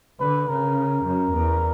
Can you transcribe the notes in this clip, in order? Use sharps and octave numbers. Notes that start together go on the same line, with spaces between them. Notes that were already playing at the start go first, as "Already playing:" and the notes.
D3 B4
C#3 A#4
F#2
E2